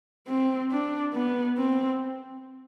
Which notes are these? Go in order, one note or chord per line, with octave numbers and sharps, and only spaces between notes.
C4
D4
B3
C4